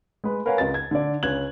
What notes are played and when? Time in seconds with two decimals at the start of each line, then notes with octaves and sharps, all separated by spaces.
0.24 G#3 B4
0.46 A#4 B4 C#5 F5 F#5 G#5
0.58 C#2 D#5 A6
0.74 G#6
0.91 D3 D5
1.23 C#2 C#4 F#6 G#6 F#7